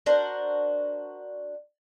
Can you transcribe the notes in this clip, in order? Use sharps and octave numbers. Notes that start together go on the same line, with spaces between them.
D4 F#4 A#4 C5